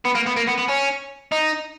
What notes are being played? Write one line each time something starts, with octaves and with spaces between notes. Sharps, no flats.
B3
A#3
B3
A#3
B3
B3
C#4
D#4